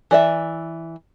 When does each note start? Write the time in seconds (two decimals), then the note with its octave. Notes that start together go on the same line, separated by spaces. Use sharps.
0.11 E3 D5 E5